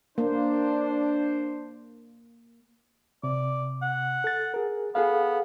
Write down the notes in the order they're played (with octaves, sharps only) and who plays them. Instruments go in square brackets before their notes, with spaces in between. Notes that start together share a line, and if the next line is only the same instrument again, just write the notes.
[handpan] A#3 [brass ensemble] D4 C5
[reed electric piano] C3 [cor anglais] D5
[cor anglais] F#5
[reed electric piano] A4 A6
G#4 A#4
[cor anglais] B3 [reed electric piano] G#4 A4 F5